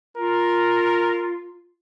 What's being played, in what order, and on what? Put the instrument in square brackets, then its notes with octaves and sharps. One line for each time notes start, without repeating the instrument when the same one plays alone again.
[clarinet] F4 [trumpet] A#4